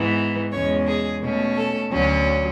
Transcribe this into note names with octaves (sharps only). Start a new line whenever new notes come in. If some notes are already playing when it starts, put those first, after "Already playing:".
Already playing: G#2 E3 B3
E2 B2 G#3 C#4 C#5
G#4
B2 A3 C#4
A4
D2 D3 F#3 C#4